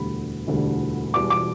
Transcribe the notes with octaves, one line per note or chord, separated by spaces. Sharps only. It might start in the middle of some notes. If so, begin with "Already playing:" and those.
Already playing: E1 D2 D3 G3 B5
E1 D2 D3 G3
E1 E2 B2 G3 D6
D6